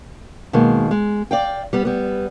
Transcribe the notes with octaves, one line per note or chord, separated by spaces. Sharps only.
B2 D#3 G#3 A#3
G#3
D5 F5 G5
G3 B3
G3 B3